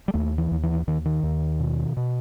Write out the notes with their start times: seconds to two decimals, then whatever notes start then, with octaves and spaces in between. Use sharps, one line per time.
0.08 G3
0.14 D#2 A3
0.38 E3
0.51 D#2
0.63 E3
0.87 D#2 D#3
1.05 D#3
1.23 D#2
1.60 B2
1.97 B2